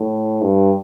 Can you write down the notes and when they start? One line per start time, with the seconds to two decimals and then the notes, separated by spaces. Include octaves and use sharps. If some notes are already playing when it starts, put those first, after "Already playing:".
Already playing: A2
0.42 G2